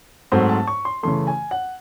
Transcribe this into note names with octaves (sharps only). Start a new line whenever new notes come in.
G#2 F#3 A3 C4 C5
A5
C#6
C6
C#3 E3 A3 C6
G#5
F#5